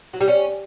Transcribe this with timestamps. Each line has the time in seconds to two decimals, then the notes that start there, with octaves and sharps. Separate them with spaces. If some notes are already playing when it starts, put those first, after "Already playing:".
0.14 F#3
0.21 G3
0.28 C#4